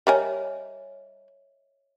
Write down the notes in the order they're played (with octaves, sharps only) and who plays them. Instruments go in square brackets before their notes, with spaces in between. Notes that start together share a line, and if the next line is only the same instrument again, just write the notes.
[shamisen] G3 A#4 G#5 [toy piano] C#5 D#5 E5